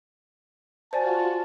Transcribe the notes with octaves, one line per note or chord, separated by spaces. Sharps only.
F4 F#4 C5 D5 G#5 A5